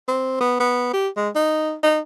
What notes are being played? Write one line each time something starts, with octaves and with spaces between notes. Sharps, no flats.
C4
B3
B3
G4
G#3
D#4
D#4